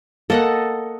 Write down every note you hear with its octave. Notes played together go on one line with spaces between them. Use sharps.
A#3 A4 D#5 F#5